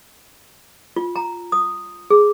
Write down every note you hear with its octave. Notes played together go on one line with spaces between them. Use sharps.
F4
A#5
D#6
G#4